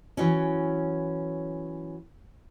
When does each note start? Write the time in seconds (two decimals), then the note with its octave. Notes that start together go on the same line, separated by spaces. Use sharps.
0.17 E3 F#3 C#4